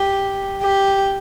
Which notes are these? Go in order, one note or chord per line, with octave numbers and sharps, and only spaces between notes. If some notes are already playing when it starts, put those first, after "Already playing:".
Already playing: G4
G4